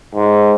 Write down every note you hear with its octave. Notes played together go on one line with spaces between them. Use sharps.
G#2